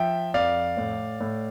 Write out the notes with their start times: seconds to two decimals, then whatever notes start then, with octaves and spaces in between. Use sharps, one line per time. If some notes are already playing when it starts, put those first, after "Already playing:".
Already playing: F3 E5 G5
0.34 F2 D5 F5
0.77 A2
1.21 A2